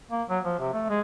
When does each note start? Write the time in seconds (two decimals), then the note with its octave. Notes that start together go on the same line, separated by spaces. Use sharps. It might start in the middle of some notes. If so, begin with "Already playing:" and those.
0.11 A#3
0.29 F#3
0.44 F3
0.59 C3
0.73 A3
0.89 G#3